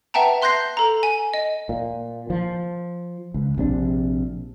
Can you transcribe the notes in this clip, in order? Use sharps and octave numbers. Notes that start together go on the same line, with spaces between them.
B4 E5 F#5 G5 A5 A#5
E5 C6 F#6 G6 A#6 C7
A4 A#5
G#5
D#5
A#2
F3
C#2
A#1 C3 D4